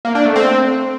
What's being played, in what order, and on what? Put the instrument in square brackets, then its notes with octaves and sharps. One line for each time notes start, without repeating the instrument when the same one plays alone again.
[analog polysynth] A#3
D4
A3
C4